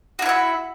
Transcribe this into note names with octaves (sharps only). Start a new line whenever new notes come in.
E4 F#4 E5 F#5